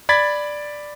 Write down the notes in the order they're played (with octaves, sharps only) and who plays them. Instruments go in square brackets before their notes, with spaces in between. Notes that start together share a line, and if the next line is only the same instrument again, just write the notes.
[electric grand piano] D5 B5 G#6 A6 B6